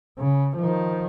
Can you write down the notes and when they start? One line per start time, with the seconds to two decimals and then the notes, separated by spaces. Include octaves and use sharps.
0.19 C#3
0.57 D#3 F3